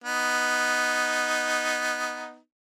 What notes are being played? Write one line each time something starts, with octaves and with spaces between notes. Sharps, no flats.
B3 D#4